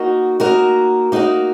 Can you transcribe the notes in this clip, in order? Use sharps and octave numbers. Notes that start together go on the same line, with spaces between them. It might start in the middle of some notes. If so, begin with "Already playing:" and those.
Already playing: A#3 D#4 F#4 A#4
A#3 D#4 F#4 A#4
A#3 D#4 F#4 A#4